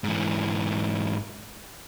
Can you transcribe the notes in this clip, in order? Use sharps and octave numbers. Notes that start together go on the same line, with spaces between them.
G#2 E3